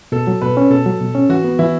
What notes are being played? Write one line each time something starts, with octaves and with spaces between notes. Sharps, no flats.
B2 A4
F#3
B2 B4
C#4
B2 A4
F#3
B2
C#4
E3 F#4
B3
E3 E4